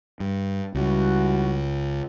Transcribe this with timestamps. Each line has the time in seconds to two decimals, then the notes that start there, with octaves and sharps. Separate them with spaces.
0.20 G2
0.75 C#2 G3 E4 F#4